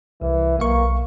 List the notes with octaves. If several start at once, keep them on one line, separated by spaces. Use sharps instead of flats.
C2 E3
B1 A#3 F5 C#6